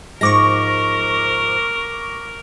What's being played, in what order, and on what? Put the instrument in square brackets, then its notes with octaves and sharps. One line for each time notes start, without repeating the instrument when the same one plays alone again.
[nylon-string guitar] G#2 F3 G#3 [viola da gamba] A#4 [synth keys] C#6 D6 A#6